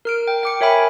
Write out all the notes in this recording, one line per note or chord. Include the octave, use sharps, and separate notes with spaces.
A#4 F6 D7
G5
G5 D6 C#7
A#4 C#5 E5 G5 G#5 B5